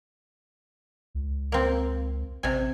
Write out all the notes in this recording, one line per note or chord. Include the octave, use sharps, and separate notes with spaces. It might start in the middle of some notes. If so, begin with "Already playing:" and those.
C#2
A#3 C4
A1 C3 G#5